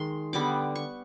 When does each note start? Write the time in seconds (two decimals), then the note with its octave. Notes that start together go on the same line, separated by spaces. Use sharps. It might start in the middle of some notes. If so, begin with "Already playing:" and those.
Already playing: D#3 G#3 C6
0.33 D3 G3 B3 D6
0.75 C#6